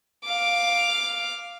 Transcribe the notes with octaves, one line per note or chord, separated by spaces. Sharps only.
F5 D6